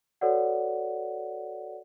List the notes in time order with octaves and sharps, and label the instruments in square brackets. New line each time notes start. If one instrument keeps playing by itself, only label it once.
[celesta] F#4 A4 B4 C#5 D5 F#5